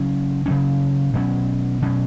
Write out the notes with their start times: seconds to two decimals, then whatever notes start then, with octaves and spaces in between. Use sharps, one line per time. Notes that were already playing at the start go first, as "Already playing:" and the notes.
Already playing: C#3 F#3 C#4
0.46 C#3 F#3 C#4
1.14 B2 F#3 C#4
1.82 B2 F#3 C#4